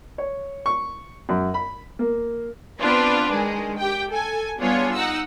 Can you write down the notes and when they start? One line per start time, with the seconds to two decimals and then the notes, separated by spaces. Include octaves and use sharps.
0.18 C#5
0.66 C#6
1.29 F#2
1.54 B5
1.99 A#3
2.80 B3 C4 D4 F4 B4
3.30 D#3 G#3 G#4
3.78 G4 G5
4.10 A4 G#5
4.58 G3 B3 D4 F4 G#4 C#5
4.94 D#4 F#5 E6